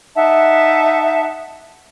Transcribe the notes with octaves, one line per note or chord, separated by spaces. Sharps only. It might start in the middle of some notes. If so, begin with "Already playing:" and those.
D#4 E5 F#5 A5